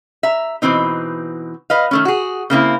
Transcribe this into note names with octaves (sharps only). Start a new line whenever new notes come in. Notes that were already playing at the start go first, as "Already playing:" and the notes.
E5 A#5
B2 E3 C4 D#4
B4 D#5 F5
D#3 A3 C#4
F#4 G#4
C#3 A#3 C4 E4